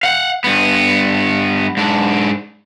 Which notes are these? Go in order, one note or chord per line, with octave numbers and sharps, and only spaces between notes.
F5 F#5
G2 B3
G#2 D4